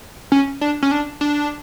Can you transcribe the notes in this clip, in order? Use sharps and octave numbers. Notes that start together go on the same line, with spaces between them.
C#4
D4
C#4
D4
D4